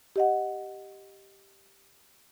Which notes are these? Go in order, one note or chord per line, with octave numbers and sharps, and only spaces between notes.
G4 D#5 F#5